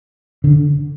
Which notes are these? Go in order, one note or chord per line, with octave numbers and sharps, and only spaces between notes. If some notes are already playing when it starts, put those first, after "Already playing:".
D3